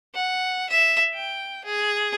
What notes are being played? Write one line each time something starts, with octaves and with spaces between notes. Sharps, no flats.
F#5
E5
G5
G#4